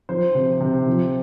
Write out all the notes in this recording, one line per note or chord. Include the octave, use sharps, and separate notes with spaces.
F3 C5
C3
C3
F3